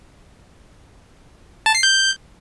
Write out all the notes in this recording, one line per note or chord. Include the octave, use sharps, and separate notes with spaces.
A5
C7
G6